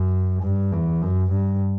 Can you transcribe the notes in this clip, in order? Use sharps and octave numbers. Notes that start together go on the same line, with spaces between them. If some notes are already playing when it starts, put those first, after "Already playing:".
Already playing: F#2
G2
E2
F#2
G2